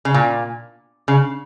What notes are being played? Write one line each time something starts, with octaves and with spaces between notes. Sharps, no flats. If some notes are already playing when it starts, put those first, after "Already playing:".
C#3
A#2
C#3